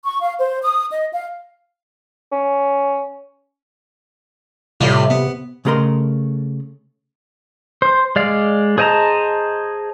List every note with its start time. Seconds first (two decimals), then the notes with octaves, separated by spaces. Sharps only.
0.05 C#6
0.21 F5
0.39 C5
0.62 D#6
0.92 D#5
1.12 F5
2.32 C#4
4.81 A2 C3 G3 F4
5.10 B3
5.65 C#3 A3 G#4 A#4 D#5 C6
7.82 C5
8.16 G#3 D5 F5
8.78 G#4 C5 D#5 A5 A#5